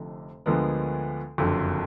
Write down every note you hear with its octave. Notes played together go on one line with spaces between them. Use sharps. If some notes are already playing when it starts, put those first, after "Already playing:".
Already playing: F1 F2 D3
D2 D3 F3 G#3 B3 A#4
F#1 F2 D3 F#3